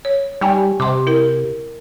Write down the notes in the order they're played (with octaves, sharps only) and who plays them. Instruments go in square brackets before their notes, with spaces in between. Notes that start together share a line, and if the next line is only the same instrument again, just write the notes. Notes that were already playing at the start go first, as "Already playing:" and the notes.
[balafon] C#5
[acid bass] G3 [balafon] D#4 G5 G#5
[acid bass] C3 [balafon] C6 D6
[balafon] E4 A#4